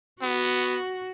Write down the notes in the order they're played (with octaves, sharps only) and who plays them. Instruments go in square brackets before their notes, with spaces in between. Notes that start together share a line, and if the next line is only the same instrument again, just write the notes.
[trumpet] B3 [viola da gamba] F#4